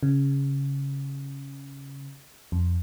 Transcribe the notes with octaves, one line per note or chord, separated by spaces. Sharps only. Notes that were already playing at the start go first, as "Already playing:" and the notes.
C#3
F2